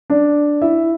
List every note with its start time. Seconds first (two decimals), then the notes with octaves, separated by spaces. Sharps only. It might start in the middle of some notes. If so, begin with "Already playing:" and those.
0.10 D4 D5
0.61 E4 E5